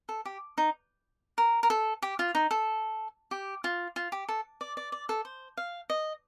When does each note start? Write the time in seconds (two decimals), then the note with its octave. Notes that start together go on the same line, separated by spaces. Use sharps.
0.09 A4
0.25 G4
0.58 D#4
1.38 A#4
1.63 A#4
1.70 A4
2.02 G4
2.19 F4
2.35 D#4
2.51 A4
3.31 G4
3.64 F4
3.96 F4
4.12 G4
4.29 A4
4.61 D5
4.77 D5
4.92 D5
5.09 A4
5.25 C5
5.57 F5
5.90 D#5